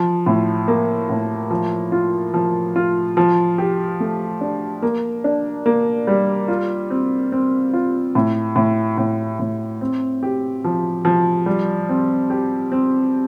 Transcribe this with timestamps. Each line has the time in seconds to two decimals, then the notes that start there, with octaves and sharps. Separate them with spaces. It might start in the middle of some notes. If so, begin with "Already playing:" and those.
Already playing: F3
0.26 A2
0.68 A#3
1.09 A2
1.50 F3
1.92 F4
2.34 F3
2.76 F4
3.17 F3
3.58 G4
4.00 A3
4.41 D4
4.82 A#3
5.24 D4
5.66 A#3
6.07 G3
6.48 F4
6.90 C4
7.32 C4
7.73 F4
8.15 A2
8.56 A2
8.98 A2
9.39 A2
9.81 C4
10.23 G4
10.64 F3
11.05 F3
11.46 G3
11.89 C4
12.30 G4
12.72 C4